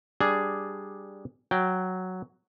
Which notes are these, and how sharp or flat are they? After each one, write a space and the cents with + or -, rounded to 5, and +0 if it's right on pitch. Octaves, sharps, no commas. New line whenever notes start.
G3 +0 D4 +0 G#4 +0
F#3 +0 G5 +0